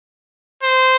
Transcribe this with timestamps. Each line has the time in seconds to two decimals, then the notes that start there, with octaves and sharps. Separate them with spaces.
0.63 C5